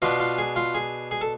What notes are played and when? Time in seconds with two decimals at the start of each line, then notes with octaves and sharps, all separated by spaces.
0.02 B2 B3 D4 F4
0.19 F4
0.38 G#4
0.56 F4
0.74 G#4
1.11 G#4
1.21 A4